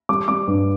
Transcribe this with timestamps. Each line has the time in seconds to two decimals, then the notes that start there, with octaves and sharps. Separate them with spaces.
0.09 G3 D6
0.28 G3 D6
0.47 G2